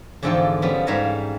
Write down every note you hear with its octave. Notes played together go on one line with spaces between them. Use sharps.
E2 G#2 D3 F3 A4 G5
F3 G3 B3 C#4
G#2 G3 C#5 E5 F5 A#5